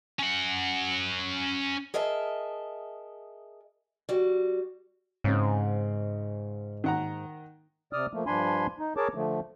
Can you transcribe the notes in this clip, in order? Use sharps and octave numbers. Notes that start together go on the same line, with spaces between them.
C#4 F#5
G#4 A#4 D#5 E5 A5
G3 F#4
G#2 C#3 C4
D#3 F#5 A#5
C3 D5 D#6 F6
F3 A3 A#3
G2 F3 D4 G#5 B5 C6
D#4
G#4 A#4 C#5 A5 D6
D3 F3 A3